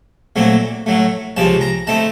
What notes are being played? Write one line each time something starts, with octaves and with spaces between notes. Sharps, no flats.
A#2 F#3 A3 C4
A2 F#3 A3
C#2 C3 F3 C4 A5
A#5
D#3 A3 C4 A5